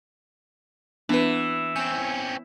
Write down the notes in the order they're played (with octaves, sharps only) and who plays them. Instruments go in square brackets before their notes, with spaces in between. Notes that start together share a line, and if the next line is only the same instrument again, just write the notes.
[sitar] E3 [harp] B3 [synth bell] D4 B4
[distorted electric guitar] C4 C#4 [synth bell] G6